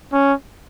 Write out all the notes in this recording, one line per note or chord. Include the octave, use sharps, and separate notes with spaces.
C#4